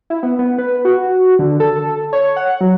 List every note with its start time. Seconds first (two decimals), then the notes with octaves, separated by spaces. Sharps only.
0.10 E4
0.23 B3
0.39 B3
0.58 B4
0.85 F#4
1.39 D3
1.60 A4
2.13 C#5
2.36 F#5
2.61 F#3